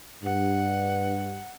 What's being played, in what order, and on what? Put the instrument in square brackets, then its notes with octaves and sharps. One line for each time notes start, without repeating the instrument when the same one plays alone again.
[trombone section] G2 [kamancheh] F#5